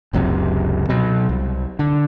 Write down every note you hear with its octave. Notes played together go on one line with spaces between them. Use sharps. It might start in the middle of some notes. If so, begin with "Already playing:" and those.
F#1 C#2 F#2 C3
B2 F#3
C2
D3